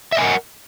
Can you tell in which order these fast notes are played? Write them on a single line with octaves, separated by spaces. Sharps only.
E5 D#5 G#5 A#4 F#5